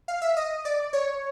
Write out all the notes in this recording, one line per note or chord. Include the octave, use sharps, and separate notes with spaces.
F5
E5
D#5
D5
C#5